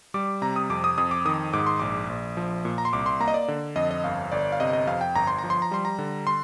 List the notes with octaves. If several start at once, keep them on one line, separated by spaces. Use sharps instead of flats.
G3 D6
C3 A#5
D#6
F2 D6
D#6
F2 D#6
D6
D#3 D#6
G#2 D6
C6
A#1 D6
A#1
F3
A#2
A#5
C6
C2 D6
C6
A#3 A#5
D#5
D5
D3
F2 D#5
D#5
G1 F5
G1 D5
F5
C3 D#5
D#5
F2 F5
G5
G1 A#5
C6
A#5
F3
C6
A#5
G3 C6
A#5
D3
C6